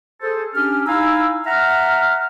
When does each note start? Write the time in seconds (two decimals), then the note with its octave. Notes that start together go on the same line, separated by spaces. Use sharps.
0.21 G#4 A4 C5
0.54 C#4 D4 G4 F6
0.86 D#4 E4 F5 G#5 E6
1.45 E5 F#5 A#5 F6